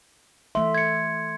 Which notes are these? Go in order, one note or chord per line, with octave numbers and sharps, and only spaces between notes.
E3 A3 E5 C6
G#6 C#7